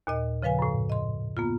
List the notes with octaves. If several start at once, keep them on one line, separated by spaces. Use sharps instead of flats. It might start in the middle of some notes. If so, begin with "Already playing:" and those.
D#2 A#2 D#5
C#3 F3 B4 F5 G#5
F#2 A2
D#5 C6
A#3 B3 F4